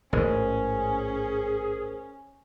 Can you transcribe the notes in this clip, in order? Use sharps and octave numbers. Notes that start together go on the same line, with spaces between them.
A1 G#2 C#4 G#4 A#4 C5